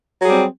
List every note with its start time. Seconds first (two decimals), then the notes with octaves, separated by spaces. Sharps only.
0.21 F#3
0.24 G#4
0.27 G3
0.30 C4